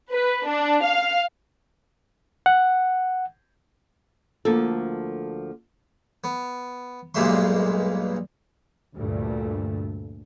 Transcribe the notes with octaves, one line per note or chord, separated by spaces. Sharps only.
B4
D4
F5
F#5
D2 F3 A#3 A4
B3
B1 G2 A#2 G#3 E5 C6
D2 G2 A#2 A3